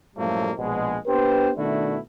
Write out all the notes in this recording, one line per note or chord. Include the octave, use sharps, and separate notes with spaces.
F#2 A2 F3 G3 A3 A#3
A#1 B2 G#3
B3 D4 G4 B4 C5
B2 D#3 A3 D4 E4 F#4